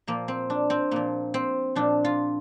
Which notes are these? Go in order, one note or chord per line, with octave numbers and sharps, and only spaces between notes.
A#2 F3 A#3
C4
D4
C4
A#2 F3 A#3
C4
A#2 F3 D4
F4